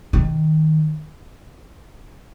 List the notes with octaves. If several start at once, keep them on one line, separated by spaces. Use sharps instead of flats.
D#3